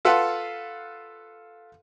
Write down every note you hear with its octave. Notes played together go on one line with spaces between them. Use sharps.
F4 A4 B4 F5 F#5